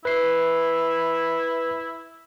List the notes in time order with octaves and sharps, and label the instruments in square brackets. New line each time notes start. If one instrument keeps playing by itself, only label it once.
[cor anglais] E4 [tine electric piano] B4 C7